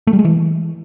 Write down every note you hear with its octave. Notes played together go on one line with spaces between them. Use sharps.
A3
G3
G#3
E3